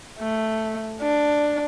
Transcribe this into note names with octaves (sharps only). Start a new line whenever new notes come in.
A3
D4